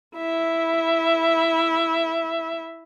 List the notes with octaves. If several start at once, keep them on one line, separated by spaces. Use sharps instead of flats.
E4 E5